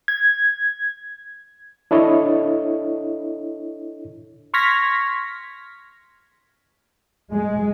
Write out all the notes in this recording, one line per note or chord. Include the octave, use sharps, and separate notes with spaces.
G#6
D4 E4 A4 C#5 D#5
C6 C#6 F6 G#6 A#6 B6
G#3